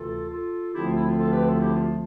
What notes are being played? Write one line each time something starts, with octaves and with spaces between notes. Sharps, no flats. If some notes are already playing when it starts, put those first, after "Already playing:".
Already playing: D2 C3 E3 F4 A4
F4 A4
D2 D3 F3 A3 C4 E4 G4
F4
E4
F4
F4 A4
G4 B4
F4 A4
E4 G4
F4
F4